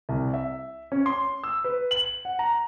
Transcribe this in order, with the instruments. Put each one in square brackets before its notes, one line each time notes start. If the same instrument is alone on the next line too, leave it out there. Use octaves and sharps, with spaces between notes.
[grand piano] C2
E5
C#4
C6
E6
B4
F#7
F#5
A#5